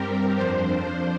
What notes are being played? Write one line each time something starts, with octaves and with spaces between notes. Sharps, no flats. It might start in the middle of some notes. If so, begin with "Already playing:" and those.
Already playing: G2 G3 C4 G4 A#4
F2 F3 D4 C5